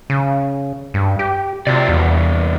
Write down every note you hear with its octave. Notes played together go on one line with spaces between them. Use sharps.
C#3
G2
G4
C3 F4 F#4 D5
E2 C3 E3